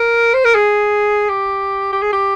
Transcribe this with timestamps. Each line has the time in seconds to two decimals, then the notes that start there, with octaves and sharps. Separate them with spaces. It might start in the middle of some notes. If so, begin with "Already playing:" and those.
Already playing: A#4
0.34 C5
0.45 A#4
0.55 G#4
1.29 G4
1.92 G4
2.02 G#4
2.12 G4